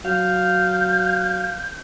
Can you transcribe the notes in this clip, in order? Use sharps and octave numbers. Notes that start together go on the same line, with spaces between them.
F#3 F5 G6